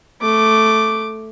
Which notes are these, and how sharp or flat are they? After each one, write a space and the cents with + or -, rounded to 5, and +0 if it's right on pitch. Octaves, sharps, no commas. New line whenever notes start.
A3 +0 D6 +0